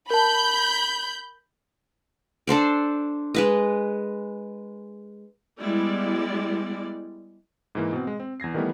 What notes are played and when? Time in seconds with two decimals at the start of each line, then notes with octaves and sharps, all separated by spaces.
0.10 A#4 A5 B5 G6
2.47 D4 A4 C5 D5
3.34 G#3 B4 D#5
5.59 G3 G#3 B3 E4 D5
7.75 G#2 E3 A#3
7.93 B2 C4
8.07 G#3
8.20 C4
8.40 E2 G#6 A#6 C7
8.54 D#3 E3 G3 A3 B3 A#4